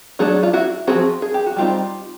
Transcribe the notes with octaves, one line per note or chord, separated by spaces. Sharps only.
F#3 A3 D4 F#4 G#4
F4
E4 F#4
F3 A3 C4 F#4 G#4
G#4
G4
F#4
G3 C4 D#4 F4 G4